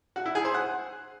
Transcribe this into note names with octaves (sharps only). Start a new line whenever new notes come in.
F#4
E4
G#4
C5
F#5